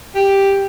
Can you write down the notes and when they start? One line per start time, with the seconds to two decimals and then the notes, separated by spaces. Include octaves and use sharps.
0.15 G4